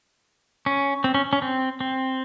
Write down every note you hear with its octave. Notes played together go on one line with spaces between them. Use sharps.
C#4
C4
C#4
C#4
C4
C4